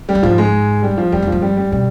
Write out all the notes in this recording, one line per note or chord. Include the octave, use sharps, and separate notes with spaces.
G3
G2
G#2 F3
G#3
G3
F3
F2 G3
F2
G2 F3
G3
G3
B2 G3